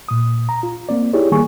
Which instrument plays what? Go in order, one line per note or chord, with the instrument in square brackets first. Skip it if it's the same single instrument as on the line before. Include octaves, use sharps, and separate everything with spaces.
[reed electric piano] A#2 D#6
A#5
F4
A#3 C4 D5
D#4 E4 G4 G#4 C#5 D5
D#3 G3 A#3 G#4 G#5 C#6